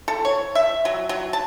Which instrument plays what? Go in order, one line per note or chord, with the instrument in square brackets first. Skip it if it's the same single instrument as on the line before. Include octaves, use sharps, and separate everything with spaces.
[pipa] A4
C#5
E5
F#3
F#3
A5